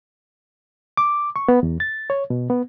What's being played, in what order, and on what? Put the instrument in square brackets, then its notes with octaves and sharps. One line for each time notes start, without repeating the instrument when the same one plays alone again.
[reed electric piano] D6
C#6
B3
E2
A6
C#5
B2
B3